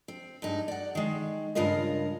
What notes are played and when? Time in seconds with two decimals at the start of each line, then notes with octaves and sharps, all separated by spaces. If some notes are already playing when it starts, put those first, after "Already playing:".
0.08 C4
0.42 G2 G#3 D#4
0.68 D5 F#5
0.95 D#3 G#3
1.55 G2 C#3 G#3 F4 A#4 D#5